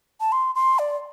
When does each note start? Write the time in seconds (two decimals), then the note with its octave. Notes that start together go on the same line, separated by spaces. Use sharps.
0.20 A5
0.32 C6
0.55 C6
0.79 D5